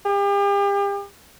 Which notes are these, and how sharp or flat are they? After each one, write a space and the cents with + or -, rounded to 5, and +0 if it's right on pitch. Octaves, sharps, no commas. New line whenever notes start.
G4 +40